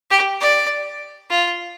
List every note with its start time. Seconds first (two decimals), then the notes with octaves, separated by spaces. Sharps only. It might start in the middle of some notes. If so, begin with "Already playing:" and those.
0.11 G4
0.40 D5
1.30 F4